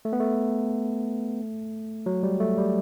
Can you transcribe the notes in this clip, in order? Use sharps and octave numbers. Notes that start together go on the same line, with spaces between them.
A3
B3
A3
F#3
G3
A3
G3